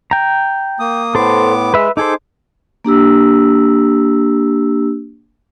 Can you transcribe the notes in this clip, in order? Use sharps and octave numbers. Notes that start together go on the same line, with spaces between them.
G5 A#5
A#3 D#6
A2 B3 A4 C5 D6
G#3 B4 E5
D#4 G#4 A4 C5 D6
A#3 D4 G4 E6